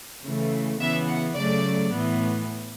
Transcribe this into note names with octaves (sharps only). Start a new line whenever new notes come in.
C#3 E3 A3
C#3 E3 B3 E5
F#5
C#3 F#3 A3 D5
A2 E3 B3